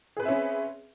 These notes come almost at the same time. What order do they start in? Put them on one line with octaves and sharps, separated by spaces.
G#4 B4 C4 E5 C#4